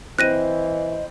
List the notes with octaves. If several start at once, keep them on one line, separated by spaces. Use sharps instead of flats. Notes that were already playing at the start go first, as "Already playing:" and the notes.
E3 C4 E4 C5 D#5 F#6 A#6 D#7